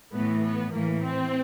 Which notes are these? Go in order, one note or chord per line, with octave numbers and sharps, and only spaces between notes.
A2 E3 B3
B3
A2 E3 A#3
C4